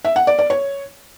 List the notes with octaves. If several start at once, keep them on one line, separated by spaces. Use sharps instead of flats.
E5
F#5
D5
D5
C#5